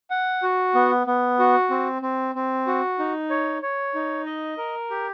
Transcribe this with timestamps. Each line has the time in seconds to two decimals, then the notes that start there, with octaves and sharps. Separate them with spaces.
0.10 F#5
0.43 F#4
0.75 B3
1.07 B3
1.39 F#4
1.70 C4
2.02 C4
2.35 C4
2.67 F#4
2.99 D#4
3.30 C#5
3.62 C#5
3.95 D#4
4.26 D#5
4.57 A#4
4.90 G4